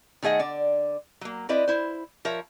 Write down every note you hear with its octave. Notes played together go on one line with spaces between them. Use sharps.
D#3 A3 G#4 D#5 F#5
D3 D5
F#3 A#3
C4 E4 B4 D5 D#5
E4 C5
F3 A#4 C#5 E5